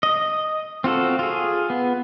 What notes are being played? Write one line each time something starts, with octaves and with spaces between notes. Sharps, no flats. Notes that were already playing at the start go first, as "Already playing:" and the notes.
D#5
C4 F4 F#4 A4
F4 G#4
B3